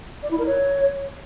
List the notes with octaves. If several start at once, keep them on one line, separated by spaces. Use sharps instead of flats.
D5
E4
A#4
C#5